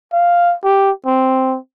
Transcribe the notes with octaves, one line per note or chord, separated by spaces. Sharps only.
F5
G4
C4